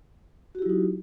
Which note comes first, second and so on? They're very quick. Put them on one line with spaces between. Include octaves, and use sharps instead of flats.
F#4 G4 E4 F#3 D#4